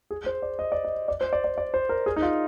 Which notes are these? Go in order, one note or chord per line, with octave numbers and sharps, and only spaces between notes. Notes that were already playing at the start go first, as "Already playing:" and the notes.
G#4
C5
D5
D#5
D5
D#5
D5
C5
D5
D5
D5
C5
A#4
G#4
D#4
F4